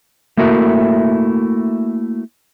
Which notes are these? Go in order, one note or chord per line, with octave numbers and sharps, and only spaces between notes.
A3 A#3 E4 F#4 A#4